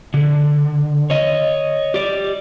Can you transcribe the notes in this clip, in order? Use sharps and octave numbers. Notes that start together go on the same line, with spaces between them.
D3
C#5 D#5
G4 D5